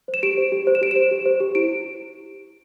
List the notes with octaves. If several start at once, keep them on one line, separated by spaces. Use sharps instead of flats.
C5
E7
G4 D7
C5
G4
C5
E7
G4 D7
C5 E7
G4
C5
G4
E4 D7